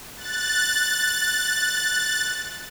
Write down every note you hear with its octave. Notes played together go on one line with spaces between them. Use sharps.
F#6 A6